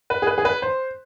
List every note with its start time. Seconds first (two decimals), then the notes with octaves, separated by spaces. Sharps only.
0.10 B4
0.22 G#4
0.27 B4
0.38 G#4
0.45 B4
0.62 C5